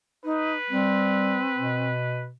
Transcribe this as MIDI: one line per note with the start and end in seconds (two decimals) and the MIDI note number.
0.24 0.53 63
0.24 2.28 71
0.70 1.42 55
0.70 1.90 60
1.58 2.33 47